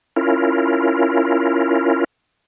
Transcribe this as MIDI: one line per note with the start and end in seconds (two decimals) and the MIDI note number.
0.16 2.04 61
0.16 2.04 64
0.16 2.04 65
0.16 2.04 70